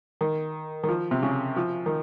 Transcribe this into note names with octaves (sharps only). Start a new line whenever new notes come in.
D#3
D#3
F3
C3
C#3
F3
D#3